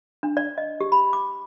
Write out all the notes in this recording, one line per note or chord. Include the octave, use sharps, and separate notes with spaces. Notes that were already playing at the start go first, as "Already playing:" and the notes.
D4
D5
D#5
G4
B5
D6